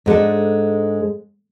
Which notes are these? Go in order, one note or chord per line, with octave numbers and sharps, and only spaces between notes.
G#2 G#3 D4 A4